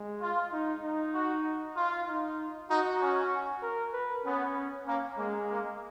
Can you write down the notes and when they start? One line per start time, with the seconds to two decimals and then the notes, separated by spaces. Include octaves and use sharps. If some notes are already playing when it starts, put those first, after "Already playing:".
Already playing: G#3
0.21 F4
0.52 D#4
0.83 D#4
1.14 F#4
1.76 F4
2.07 D#4
2.70 D#4 F#4
3.01 C#4
3.62 A#4
3.93 B4
4.25 B3 C#4
4.86 A#3 C#4
5.17 G#3 A#3
5.49 A#3